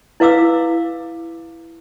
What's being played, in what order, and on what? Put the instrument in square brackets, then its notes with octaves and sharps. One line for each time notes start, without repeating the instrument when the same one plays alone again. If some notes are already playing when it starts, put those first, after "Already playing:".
[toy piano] E4 B4 F5 D6 E6